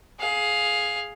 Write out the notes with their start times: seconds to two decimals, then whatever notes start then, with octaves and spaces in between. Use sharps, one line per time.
0.19 G#4 F5